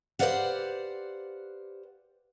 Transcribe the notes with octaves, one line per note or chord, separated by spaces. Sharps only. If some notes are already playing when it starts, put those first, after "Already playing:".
G4 B4 C5 D5 F5 F#5